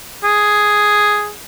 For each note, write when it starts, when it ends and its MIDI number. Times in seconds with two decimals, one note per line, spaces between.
0.24 1.31 68